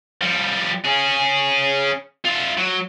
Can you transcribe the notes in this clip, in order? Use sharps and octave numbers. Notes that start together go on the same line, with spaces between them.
F3 G3
C#4 G#4
F4 E5
F#3